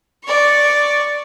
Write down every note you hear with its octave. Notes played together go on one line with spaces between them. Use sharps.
D5 C#6